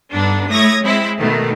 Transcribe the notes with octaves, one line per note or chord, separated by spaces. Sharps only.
G2 D3 B3 D4 D#4
A3 E4 C#5 D#6 G#6 A#6
G#3 C4 E4
B2 D#3 A3